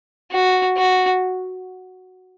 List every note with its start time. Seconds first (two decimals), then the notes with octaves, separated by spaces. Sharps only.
0.33 F#4
0.77 F#4